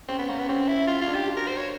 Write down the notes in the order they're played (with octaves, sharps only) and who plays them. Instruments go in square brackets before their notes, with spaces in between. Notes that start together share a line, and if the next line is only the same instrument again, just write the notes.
[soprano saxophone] C4 [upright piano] C#4
[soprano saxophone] B3
[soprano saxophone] A#3 [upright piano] C#4
[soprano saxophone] B3
[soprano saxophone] C4 [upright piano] C#4
[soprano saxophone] E4
F4
F4
[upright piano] D4
[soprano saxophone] G4
[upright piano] F#4
[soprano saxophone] A#4
C5
C#5